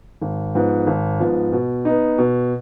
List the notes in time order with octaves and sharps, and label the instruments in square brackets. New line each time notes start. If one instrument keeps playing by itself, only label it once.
[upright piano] G#1
G#2 F3 B3
G#1
G#2 F3 B3
B2
B3 D#4
B2